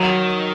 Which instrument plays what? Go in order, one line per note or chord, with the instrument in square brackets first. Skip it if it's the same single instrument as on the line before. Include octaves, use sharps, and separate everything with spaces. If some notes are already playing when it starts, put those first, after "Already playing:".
Already playing: [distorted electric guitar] D#3 [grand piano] F#3